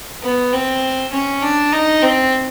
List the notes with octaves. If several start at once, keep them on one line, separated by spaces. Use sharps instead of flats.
B3
C4
C#4
D4
D#4
C4